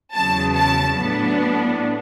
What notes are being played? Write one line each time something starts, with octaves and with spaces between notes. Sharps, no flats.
E2 C#3 F#3 A5
A5
A2 F#3 B3 D4